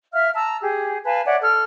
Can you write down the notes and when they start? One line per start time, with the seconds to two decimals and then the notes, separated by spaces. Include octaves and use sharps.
0.13 E5 F5 F6
0.35 A5 A#5 E6
0.62 G4 G#4
1.05 B4 F5 G#5 A5
1.25 C#5 D5 E5 F#5
1.41 A4 F6